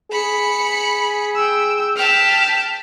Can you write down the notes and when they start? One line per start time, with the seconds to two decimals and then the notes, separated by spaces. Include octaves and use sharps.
0.11 G#4 B5 C#7
1.35 G5 E6
1.97 G5 A5 F6 B6